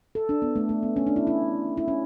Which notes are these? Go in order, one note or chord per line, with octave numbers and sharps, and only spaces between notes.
A4
D4
B3
A3
A3
B3
C#4
D4
E4
E4
E4
C#4